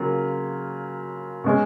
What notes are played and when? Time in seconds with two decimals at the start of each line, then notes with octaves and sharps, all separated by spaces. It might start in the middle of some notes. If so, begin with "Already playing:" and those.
Already playing: C#3 F#3 A#3 F4
1.44 B2 G#3 C#4